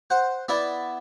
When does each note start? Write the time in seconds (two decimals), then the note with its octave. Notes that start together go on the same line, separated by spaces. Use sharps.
0.10 C5 F#5
0.48 B3 E4 D5 E5